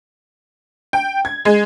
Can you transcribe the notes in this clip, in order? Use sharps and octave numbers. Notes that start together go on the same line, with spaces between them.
G5
G#6
G#3